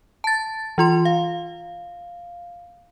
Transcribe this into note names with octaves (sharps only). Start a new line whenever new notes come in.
A5 A6
E3 F4 C6
F5